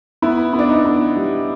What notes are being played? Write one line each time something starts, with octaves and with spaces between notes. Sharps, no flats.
B3 E4
B3
D4
D#4
B3
G3